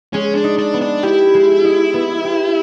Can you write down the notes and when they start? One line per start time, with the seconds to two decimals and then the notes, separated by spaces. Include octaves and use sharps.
0.13 G#3 C#4
0.35 D4
0.44 D#4
0.58 D4
0.74 B3
0.81 D4
1.03 E4 G4
1.34 G#3
1.64 D#4
1.94 B3
2.24 G4